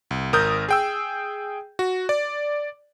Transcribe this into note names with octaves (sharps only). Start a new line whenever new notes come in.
C2
G#1 A#4 D#6 G6
G#4 G5 E6
F#4
D5